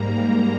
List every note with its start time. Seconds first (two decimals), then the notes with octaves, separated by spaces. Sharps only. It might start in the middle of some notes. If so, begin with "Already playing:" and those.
Already playing: G#2 G3 A#3 A#5